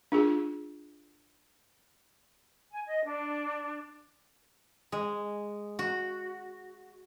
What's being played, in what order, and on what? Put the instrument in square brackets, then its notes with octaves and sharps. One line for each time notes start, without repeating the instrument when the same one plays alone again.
[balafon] D4 F4 G#4
[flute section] G#5
D#5
D4
[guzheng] G#3
F#4